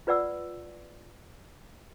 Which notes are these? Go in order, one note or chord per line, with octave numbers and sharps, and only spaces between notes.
F4 B4 D5 F#5 E6